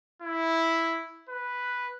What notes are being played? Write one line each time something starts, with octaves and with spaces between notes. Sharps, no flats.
E4
B4